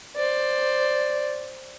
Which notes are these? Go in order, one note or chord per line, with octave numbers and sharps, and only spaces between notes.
C5 D5